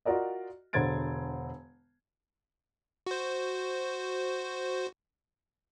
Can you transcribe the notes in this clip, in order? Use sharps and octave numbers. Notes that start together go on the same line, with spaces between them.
F4 F#4 A#4 D5 D#5
E1 D3 C5 G#6 A6 D7
F#4 C5